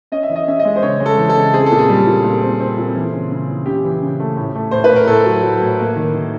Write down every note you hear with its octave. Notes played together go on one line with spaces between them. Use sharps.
C#4 D#5
E5
E3
D#5
C#4 E5
D#5
G#3
C5
C#3 C#5
G#3
A4
E3
A4
C#3
C4 G#4
A#2 A4
G#4
G3
A#2
A#2
C4
C4
A#2
E3
C#3
C#3
E3
C#3 G4
E3
C#3
A3
A2
A3
A2 C5
B4
A2
A#4
A2 A4
F#3
F#3
A2
A#3
D#3
D#3